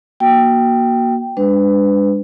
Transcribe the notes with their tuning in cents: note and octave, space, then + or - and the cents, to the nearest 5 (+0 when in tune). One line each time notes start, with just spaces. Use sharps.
A#3 +25 F#4 +0 G5 +0
G#3 -40 D4 +0 B4 +25